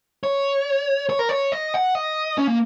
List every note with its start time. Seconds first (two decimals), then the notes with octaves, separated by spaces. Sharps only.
0.24 C#5
1.10 C#5
1.19 A#4
1.29 C#5
1.52 D#5
1.74 F#5
1.95 D#5
2.38 C#4
2.47 A#3